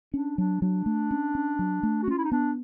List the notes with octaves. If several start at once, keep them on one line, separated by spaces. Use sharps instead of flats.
C#4 D4
F#3 D4
F#3 D4
A3
C#4
C#4
F#3
A3
F#4
C#4 F4
E4
D#4
B3 D4